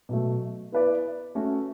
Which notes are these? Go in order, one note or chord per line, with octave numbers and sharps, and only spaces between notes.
B2 F#3 A3
B3 E4 B4 D5
A3 C#4 F#4 A4